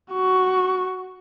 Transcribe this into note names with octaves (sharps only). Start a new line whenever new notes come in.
F#4 C#6